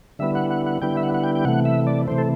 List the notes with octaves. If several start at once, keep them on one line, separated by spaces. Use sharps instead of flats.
D3 G3 B3 E4 E5
F#5
F#5
F#5
D3 G3 B3 E4 G5
E5
F#5
F#5
G5
G5
C3 E3 A3 F#5
E5
D5
C3 E3 A3 C5
A4